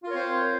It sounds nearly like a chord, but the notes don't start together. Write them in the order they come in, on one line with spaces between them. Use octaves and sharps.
F4 A#4 C#5 C4 C5